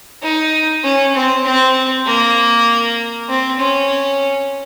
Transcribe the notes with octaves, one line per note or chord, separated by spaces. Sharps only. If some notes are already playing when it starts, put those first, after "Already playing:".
D#4
C#4
C4
C4
A#3
C4
C#4